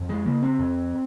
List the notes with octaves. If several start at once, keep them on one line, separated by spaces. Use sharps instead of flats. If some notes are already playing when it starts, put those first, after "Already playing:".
Already playing: F2
G#3
C#3 A#3
C4
F2